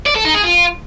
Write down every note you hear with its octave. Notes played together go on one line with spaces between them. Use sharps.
D5
A4
D#4
G#4
F4